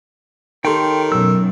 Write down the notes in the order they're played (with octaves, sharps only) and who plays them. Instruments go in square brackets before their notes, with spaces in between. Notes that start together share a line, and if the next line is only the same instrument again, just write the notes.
[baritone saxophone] D#3 [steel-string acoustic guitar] G4 A4 C#5 [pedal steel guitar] G5 C6
[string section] B1 F#2 [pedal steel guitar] E6